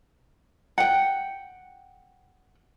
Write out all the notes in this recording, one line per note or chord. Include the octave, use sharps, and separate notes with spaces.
F#5 G5